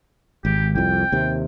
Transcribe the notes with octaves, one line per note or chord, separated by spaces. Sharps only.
G#1 G4
C2 F2 G5
D#2 C3